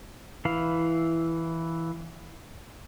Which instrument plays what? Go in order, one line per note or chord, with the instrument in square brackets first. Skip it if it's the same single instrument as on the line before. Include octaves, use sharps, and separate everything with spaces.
[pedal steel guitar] E3 E4 F5